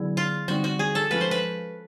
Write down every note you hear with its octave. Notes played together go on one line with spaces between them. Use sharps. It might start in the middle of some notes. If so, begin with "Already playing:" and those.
Already playing: D3 F#3 B3 E4 G#4
F4
D3 G3 C4 D#4 F#4
F#4
G#4
A4
F3 G#3 C#4 F4 B4
C5
B4